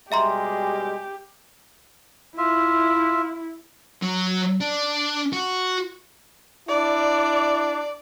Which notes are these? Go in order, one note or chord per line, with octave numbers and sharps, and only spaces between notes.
B2 G3 G#3 G4 E5 A#5 C6
E4 F4 E5
F#3
D4
F#4
D4 E4 D5